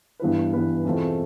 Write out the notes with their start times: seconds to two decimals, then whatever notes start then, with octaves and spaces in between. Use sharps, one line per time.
0.20 G2 E3 B3 E4 B4
0.53 G2 E3 B3 E4 B4
0.84 E2 B2 A3 C4 F4